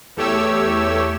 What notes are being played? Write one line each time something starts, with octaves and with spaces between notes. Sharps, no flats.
E2 A3 G4 C#5 E6